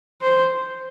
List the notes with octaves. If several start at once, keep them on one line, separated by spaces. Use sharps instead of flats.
C5